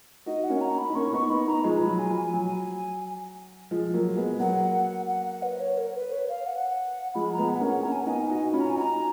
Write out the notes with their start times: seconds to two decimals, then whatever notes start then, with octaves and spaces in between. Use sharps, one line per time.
0.26 D#4 F#4 D#5
0.44 F#5
0.49 A#3 C#4
0.61 A#5
0.78 B5
0.90 D#4
0.95 A#3 C#4 C#6
1.12 B3 D#4 C#6
1.30 B3 D#4 B5
1.47 B3 D#4 A#5
1.64 F3 G#3
1.77 F3 B5
1.87 F#3
1.99 G#5
2.10 F3
2.16 G#5
2.33 F#3
3.71 F3 G#3
3.94 F#3 A#3
4.17 G#3 B3
4.40 F#3 A#3 F#5
5.09 F#5
5.26 F#5
5.43 B4
5.60 C#5
5.77 A#4
5.95 B4
6.12 C#5
6.29 F5
6.46 F#5
7.15 F3 G#3 B5
7.33 A#5
7.38 G#3 B3
7.49 F#5
7.61 A#3 C#4
7.67 F#5
7.84 A#3 C#4 A#5
7.92 G#5
8.00 F#5
8.06 B3 D#4 G#5
8.30 D#4 F#4
8.52 C#4 F4 B5
8.61 A#5
8.70 G#5
8.76 D#4 F#4 A#5